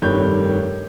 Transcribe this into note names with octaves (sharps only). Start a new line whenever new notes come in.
F1 G2 D#3 G4 C#5 G6